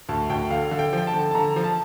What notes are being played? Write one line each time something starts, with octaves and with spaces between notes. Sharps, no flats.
D2 A5
D2 G5
D3 F5
D3
G5
F3 G5
A5
D3
A5
D3 A#5
F3
A5